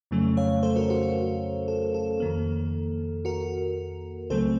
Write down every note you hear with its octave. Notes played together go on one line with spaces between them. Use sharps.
F2 C#3 F#3 A3 C#4
C#5 F5
A4 C5
F#4 A#4
F#4
F#4
A4
A4
F2 D#3 A#3
F#4 A#4
C#2 C#3 F#3 A3 C4 A4 C5